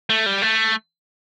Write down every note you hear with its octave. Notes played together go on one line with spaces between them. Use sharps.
A3
G3
A3